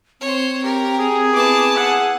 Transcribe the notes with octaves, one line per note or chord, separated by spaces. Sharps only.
C4 C5 C#5
G4 A#4
G#4
B3 E4 A5 D6
E5 F#5